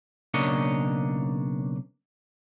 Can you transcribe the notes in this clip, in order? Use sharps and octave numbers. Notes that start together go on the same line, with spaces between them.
B1 C#3 A#3 D4 C#5 D#5